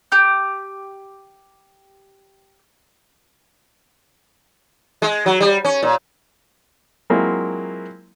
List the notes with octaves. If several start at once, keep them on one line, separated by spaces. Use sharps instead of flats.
G4 G6
G#3
F#3
G3
C#4
A#2
F#3 G#3 A#3 C4 E4 F4